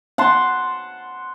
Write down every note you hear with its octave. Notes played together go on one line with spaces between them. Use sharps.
F#5 A5 C6